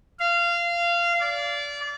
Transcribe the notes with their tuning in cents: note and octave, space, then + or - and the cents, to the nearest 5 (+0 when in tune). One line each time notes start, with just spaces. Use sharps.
F5 -20
D5 -25